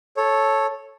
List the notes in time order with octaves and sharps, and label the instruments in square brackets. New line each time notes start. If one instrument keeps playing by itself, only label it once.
[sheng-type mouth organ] A4 C#5